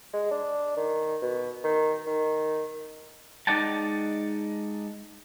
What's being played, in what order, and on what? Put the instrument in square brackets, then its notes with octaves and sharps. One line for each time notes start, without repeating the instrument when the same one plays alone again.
[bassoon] G#3
D4
D#3
B2
D#3
D#3
[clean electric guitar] G#3 D#4 D5 F#5 G5 A5